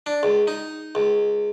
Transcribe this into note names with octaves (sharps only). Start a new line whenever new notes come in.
D4
C#2
D#4
C#2